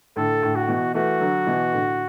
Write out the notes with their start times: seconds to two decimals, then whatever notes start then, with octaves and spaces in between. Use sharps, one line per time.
0.16 A2 D3 A4
0.42 A2 D3
0.55 F#4
0.68 B2 E3
0.94 E3 A3 F#4
1.20 D3 F#3
1.47 B2 E3
1.73 A2 D3